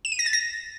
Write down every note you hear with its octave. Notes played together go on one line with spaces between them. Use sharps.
E7
D#7
A#6
A6
A#6